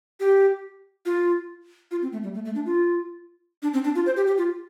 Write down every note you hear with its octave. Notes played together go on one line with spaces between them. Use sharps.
G4
F4
F4
C4
A3
G3
A3
A3
D4
F4
D4
C4
D4
F4
C5
G4
G4
F4